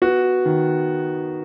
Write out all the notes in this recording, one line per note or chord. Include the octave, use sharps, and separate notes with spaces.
B3 F#4
D#3